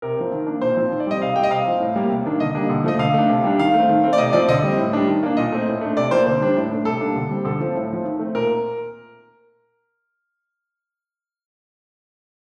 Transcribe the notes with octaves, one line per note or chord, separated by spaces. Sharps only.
C3 A#4
F3 C4
D#3
A#3 D4
A#2 C5
F3 C4
D#3
D5
G3 C4 D#5
C3 F5
G3 C4 G5
D#5
C3 F5
F3 C4
A2
G3 A#3
C3
D#3 A#3 D4
D3 D#5
G3 A#3 D4
D3
F3 A3 D#5
D3 F5
A3 D4
C3
G3 D4
D#3 F5
A3 C4
D#3
A3 C4
D5
C3 D#5
F3 C4 D5
D3 D#5
G3 C4
A2
G3 D4
D#3
A#3 D4
A#2 D#5
A3 C4
A2
A3 D4
C3 D5
F3 A#3 C5
D3 C5
G3 D4
A2
A3 D4
C3 A4
G3 A#3 D4
D3
G3 C4
D3 A4
F3 C4
A2
F3 C4
D#3
A3 C4
A#2 A#4